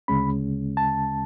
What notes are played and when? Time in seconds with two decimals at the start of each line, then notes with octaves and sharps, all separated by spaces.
0.08 D2 C#3 G#3 C#4 B5
0.77 A5